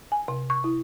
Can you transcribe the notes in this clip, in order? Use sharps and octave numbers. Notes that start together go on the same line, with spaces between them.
G#5
C3
C#6
E4